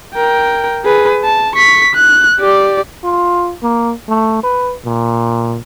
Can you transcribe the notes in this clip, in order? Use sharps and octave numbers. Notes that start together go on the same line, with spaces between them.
A#4 G5
G#4 B4
A5
C#6 B6
F#6
G4 D5
F4
A#3
A3
B4
A#2